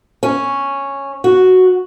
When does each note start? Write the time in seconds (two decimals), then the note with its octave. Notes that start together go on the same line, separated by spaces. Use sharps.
0.23 C#4
1.24 F#4